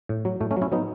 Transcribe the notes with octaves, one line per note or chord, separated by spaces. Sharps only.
A2
F#3
A2 A3
A3 C#4
F#3
C#4 E4
F#3 B3 D#4